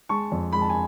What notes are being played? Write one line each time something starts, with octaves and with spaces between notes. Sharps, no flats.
G#3 A5 C#6
F2
G#3 B5
A5
G#5